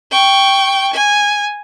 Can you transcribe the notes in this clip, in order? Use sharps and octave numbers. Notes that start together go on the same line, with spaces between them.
G5 C#6
G#5